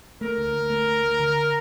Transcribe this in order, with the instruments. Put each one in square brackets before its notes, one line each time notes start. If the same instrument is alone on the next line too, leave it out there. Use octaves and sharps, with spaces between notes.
[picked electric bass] A3 [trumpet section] A#4
[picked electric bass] D2
D2
A3
D2
D2
D3